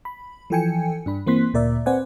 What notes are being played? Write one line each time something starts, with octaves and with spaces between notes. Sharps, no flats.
B5
E3 F3 A4 G5 G#5 C#7
G2 D4 B5
E3 A#3 C4 C6 F#6 B6
D2 A#2 A#4 D5 E5
C4 B4 C5 D5 F#5 G#5